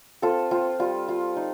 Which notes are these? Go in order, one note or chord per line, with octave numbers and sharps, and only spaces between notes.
C4 F4 A4
C4 F4
G3 F4
F4
D#4